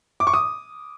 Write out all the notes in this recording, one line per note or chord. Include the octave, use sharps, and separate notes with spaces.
D6
C#6
D#6